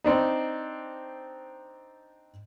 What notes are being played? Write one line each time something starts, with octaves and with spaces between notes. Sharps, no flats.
C4 D4 D#4